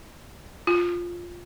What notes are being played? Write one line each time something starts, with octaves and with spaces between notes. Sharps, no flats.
F4